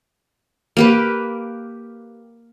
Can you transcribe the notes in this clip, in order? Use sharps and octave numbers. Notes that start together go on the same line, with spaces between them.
A#3 G4 B4